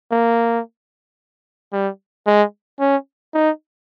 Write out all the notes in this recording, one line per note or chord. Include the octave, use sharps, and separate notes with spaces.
A#3
G3
G#3
C#4
D#4